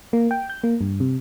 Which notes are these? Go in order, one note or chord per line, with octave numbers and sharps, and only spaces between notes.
A#3
G5
G6
A#3
G2
C3